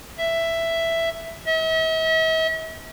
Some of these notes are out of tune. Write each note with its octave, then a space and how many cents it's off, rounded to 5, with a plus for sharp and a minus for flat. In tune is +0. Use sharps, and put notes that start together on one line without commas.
E5 +5
E5 -45